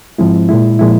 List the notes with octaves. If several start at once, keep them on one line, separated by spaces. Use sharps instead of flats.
G#2 F3 G#3 C4 E4
A#2 G#3 E4
A#2 F3 G#3 E4